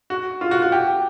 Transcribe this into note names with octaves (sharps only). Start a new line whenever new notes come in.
F#4
F4
F#4
F#4
G4